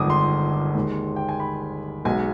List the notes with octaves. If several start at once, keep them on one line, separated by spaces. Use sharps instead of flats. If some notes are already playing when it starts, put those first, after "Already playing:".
Already playing: G1 F2 D#3 G#3 G#5 D6 D#6
C6
D#2 D#3 G#3
G5
G#5
B5
B1 B2 G#3 G#5